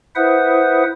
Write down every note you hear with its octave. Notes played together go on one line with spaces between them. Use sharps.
E4 B4 C5 E5 F#5 D#6